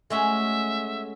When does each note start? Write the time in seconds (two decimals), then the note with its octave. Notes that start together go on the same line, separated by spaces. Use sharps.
0.10 G#3 A3 C#4 F#4 E5